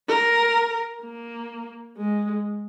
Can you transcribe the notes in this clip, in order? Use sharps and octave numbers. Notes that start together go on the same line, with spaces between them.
A#4
A#3
G#3